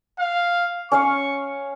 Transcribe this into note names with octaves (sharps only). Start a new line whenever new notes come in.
F5
C#4 C#5 F5 C#6